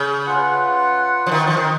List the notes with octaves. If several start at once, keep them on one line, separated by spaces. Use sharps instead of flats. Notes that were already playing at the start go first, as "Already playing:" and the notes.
Already playing: C#3
F4 B4 F#5
F3
D#3
F3
D#3